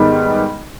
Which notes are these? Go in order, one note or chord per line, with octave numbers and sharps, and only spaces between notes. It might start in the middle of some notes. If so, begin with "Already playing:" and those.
Already playing: G#2 D#3 G3 B3